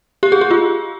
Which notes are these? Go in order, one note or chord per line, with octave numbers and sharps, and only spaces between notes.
G4
G#4
G4
F4